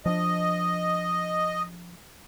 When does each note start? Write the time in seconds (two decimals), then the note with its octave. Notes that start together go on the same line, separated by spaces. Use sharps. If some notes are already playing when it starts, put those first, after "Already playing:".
0.06 F3 C4 D4 D#5